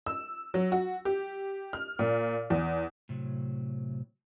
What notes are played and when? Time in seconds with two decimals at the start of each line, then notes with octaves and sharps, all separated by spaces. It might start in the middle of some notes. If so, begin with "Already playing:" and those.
0.06 E6
0.54 F#3
0.72 F#4
1.05 G4
1.73 F6
1.99 A#2
2.50 E2
3.09 A2 C3 F#3